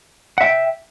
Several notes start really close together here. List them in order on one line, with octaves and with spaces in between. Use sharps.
F#5 E5 G5